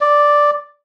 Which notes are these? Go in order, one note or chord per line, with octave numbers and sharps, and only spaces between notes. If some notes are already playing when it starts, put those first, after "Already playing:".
D5